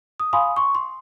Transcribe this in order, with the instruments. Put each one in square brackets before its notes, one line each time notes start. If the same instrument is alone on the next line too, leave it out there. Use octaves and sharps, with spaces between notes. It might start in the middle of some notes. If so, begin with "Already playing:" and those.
[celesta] D#6
F5 G#5 B5 C6 D#6
C6 C#6
C6